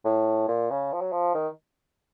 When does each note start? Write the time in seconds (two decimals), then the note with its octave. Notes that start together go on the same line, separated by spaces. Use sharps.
0.05 A2
0.48 A#2
0.71 C#3
0.93 F3
1.01 F#3
1.12 F3
1.35 D#3